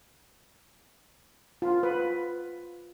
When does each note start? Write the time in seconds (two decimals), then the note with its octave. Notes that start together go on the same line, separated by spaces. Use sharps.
1.62 F4
1.83 B4